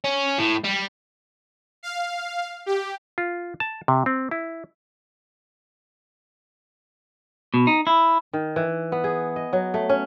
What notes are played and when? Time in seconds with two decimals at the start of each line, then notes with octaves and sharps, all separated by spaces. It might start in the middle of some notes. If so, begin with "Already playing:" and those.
0.04 C#4
0.38 A2
0.64 G3
1.83 F5
2.66 G4
3.18 F4
3.60 A5
3.88 C3
4.06 C4
4.31 E4
7.54 B2
7.67 D#4
7.87 E4
8.33 D#3
8.56 E3
8.92 B3
9.04 G#4
9.36 D#5
9.53 F#3
9.74 A3
9.89 C#4